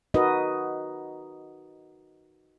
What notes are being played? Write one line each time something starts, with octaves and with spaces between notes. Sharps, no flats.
D#4 F#4 A#4 B4 D#5